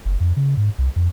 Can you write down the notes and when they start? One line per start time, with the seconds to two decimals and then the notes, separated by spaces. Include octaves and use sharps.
0.05 F#1
0.20 F2
0.36 C#3
0.57 G#2
0.78 C2
0.96 F2